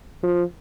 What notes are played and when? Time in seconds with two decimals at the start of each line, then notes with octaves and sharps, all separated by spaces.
0.23 F3